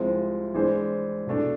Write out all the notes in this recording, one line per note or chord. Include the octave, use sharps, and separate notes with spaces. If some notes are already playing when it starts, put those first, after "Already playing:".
Already playing: C2 C3 F3 G#3
E3 G#3 D4 G#4 C5
B2 A3 D4